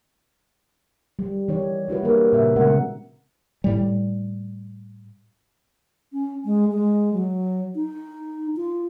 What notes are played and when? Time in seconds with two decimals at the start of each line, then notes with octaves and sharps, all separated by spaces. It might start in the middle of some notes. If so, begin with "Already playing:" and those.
1.19 G3
1.48 E3 D#4 G4 C#5
1.88 G3 E4 F#4 B4
2.03 A#3 D4 G4 A#4 B4
2.33 A#2 C#3 E5
2.56 C#3 G#3 B3 A#4 F#5
3.64 A2 G3
6.13 C#4
6.45 G#3
6.71 G#3
7.13 F#3
7.75 D#4
8.56 F4